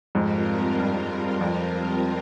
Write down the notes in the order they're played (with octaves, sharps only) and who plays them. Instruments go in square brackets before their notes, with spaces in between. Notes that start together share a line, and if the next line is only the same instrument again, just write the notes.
[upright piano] F2 G#2 [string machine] G3 C4 F4 A#4
[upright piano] G2
F2